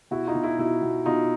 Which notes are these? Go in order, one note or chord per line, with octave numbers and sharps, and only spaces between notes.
B2 E4 F#4
D#4 F4
B2
E4
B2 E4
B2
B2 D#4 F4